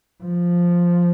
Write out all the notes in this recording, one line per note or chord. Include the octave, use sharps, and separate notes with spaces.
F3